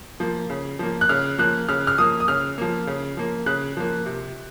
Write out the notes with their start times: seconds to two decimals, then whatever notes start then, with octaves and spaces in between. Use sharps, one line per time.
0.20 F3 A#3
0.50 C#3
0.79 F3 A#3
1.01 F#6
1.09 C#3 F6
1.38 F3 A#3 F#6
1.69 C#3 F6
1.87 F6
1.98 F3 A#3 D#6
2.20 D#6
2.28 C#3 F6
2.58 F3 A#3
2.87 C#3
3.17 F3 A#3
3.46 C#3 F#6
3.77 F3 A#3
4.06 C3